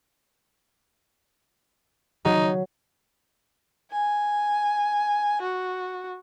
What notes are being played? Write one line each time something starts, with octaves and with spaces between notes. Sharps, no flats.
F#3 D#4
G#5
F#4